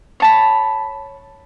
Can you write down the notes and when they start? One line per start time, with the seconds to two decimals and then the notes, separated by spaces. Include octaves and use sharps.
0.20 C#5 A5 B5